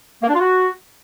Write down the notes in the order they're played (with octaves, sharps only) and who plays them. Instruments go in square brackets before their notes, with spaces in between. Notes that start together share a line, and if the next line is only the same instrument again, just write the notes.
[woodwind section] A#3
D4
F4
F#4